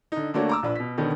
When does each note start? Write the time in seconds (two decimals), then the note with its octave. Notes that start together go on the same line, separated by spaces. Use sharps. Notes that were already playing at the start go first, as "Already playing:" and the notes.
0.12 D3 D#4
0.34 D3 A3 A#3 D4 F#4 C#5
0.49 A#5 D6 E6
0.63 A#1 D4 B4
0.75 B2 B6
0.97 B2 D3 D#3 B3 C#4